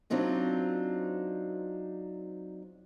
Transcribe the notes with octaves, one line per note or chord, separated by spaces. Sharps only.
F#3 C4 D4 D#4 F4